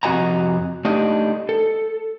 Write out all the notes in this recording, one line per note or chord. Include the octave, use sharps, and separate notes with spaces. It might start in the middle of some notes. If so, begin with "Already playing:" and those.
F2 C3 F#4 D#5 G#5 A#5
A3 D4 D#4 G4 D#5
A4